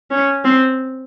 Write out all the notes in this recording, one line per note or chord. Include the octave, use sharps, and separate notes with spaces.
C#4
C4